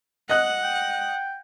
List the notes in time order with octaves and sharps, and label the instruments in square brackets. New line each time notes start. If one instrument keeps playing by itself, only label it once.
[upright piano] D#5 F#6 [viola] F#5
[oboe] G5